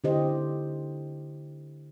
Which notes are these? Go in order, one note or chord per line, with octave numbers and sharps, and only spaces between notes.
D3 E4 G4 C5 D#5